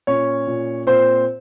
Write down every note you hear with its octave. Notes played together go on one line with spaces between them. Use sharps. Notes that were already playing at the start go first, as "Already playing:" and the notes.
A#2 C#4 C#5
A#2
A#2 C4 C5